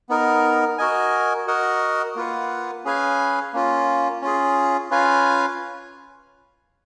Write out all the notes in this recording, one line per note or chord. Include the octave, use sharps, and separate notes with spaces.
B3 D#4 A#4
F#4 A#4 D#5 G#5
F#4 A#4 D#5 F#5
A#3 F4 B4 F#5
C#4 G#4 B4 F5 G#5
A#3 C#4 F4
C#4 F4 G#4
C#4 F4 B4 F5 G#5